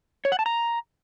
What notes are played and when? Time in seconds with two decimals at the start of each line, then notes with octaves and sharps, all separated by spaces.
0.25 C#5
0.32 F#5
0.39 A5
0.46 A#5